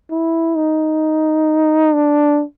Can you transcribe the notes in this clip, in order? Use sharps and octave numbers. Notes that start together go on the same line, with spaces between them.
E4
D#4
D4